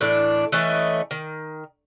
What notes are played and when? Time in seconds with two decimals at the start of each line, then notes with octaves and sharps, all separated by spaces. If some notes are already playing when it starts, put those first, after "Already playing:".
0.01 A2 E3 D4
0.52 E3 A3 C#4 D#5
1.11 D#3